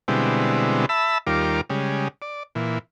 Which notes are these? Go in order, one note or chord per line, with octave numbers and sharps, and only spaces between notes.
B2 D3 G3 G#3 C4 E4
E5 A5 B5 E6
D#2 G3 F4 A#4 D6
C#3 G3 G#3
D5
A#2 E3